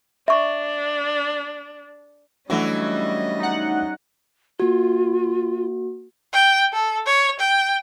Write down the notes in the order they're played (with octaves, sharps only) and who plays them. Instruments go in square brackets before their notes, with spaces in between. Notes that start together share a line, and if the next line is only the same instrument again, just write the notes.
[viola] D4 [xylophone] E5 C#6
[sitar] E3 F#3 F#4 [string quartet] G3 C#4 D#5 [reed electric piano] A3 D4
[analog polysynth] D#4 F#5
[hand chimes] A#3 F#4 [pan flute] F4
[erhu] G5
A4
C#5
G5